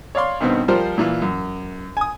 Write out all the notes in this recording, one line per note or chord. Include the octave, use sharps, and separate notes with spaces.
C#5 D5 F5 C6
G2 B2 D#3 B3 C4
F3 G3 F4 A#4 C5
A#2 E3 F4
F#2
G#5 D#6